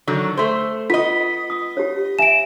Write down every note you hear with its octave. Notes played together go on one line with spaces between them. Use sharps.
D3 D#3 F#3
A3 C5
B3 F4 D#5 B6
D#6
G4 C#5
E5 G#5 D7 E7